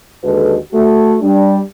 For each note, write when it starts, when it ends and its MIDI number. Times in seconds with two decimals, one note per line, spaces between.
0.24 0.55 39
0.24 0.55 50
0.24 0.55 56
0.24 0.55 66
0.24 0.55 69
0.24 0.55 71
0.72 1.16 57
0.72 1.16 66
1.21 1.58 55
1.21 1.58 62